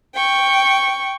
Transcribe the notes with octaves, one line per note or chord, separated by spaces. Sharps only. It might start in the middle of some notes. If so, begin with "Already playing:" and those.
G5 C#6